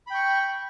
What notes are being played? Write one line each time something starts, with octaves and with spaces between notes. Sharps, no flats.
G5 B5 C#6